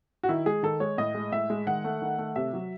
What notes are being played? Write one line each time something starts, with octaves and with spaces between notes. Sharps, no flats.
F#4
D#3 E4
G#3 G#4
D#3 A4
G#3 C#5
A2 D#5
G#3
A2 E5
G#3
D#3 F#5
A3
D#3
A3
C3 E5
F#3